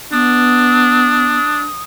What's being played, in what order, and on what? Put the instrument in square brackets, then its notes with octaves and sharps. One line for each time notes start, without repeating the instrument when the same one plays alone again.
[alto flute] B3 [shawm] D4 [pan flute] D#6